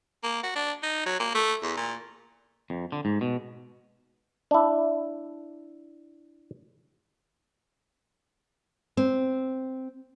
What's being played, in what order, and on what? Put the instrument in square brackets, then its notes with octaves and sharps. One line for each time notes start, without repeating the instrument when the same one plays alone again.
[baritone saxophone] A#3
F#4
D4
D#4
F#3
A#3
A3
E2
A#2
[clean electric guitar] F2
D3
G#2
B2
[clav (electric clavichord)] D4 E4
[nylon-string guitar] C4